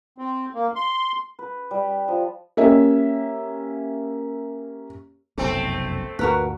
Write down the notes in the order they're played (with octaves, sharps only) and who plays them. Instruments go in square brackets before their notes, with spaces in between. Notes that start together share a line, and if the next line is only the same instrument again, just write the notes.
[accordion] C4
A#3
C6
[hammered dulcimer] B4
G3
F3
[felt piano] A#3 C#4 G4 E5
[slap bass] F1 B1 F#2 [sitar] A3 C4
[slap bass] D2 G2 A#2 [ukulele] F#4 A#4 B4